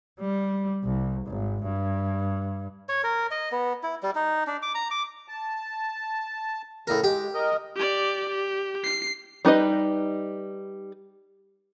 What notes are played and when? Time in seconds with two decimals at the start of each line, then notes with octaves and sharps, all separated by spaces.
0.20 G3
0.84 C2
1.27 G#1
1.64 G2
2.89 C#5
3.03 A#4
3.31 D#5
3.52 B3
3.83 E4
4.03 G3
4.15 D#4
4.47 D4
4.62 D6
4.75 A#5
4.91 D6
5.28 A5
6.87 A2 C#3 A#4
7.04 G#3 G4
7.34 A#4 D#5
7.76 G4 D5
8.29 G4
8.84 C7
9.45 G3 D#4 B4 D#5